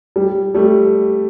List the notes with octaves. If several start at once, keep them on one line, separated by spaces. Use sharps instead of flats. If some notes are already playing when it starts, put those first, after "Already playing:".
G3
G3 A3